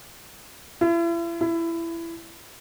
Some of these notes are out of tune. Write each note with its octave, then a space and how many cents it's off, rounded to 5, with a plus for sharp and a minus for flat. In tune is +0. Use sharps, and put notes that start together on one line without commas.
E4 +40
E4 +20